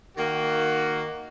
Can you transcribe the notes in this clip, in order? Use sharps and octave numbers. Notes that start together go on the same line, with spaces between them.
D#3 A#3 F#4